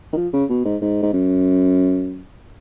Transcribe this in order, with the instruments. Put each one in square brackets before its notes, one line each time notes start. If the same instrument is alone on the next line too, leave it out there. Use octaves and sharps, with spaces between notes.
[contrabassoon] D#3
F3
C#3
B2
G#2
G#2
G#2
F#2